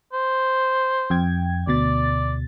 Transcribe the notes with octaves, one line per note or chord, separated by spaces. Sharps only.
C5
F2 G5 G#6
D2 B2 D5 A6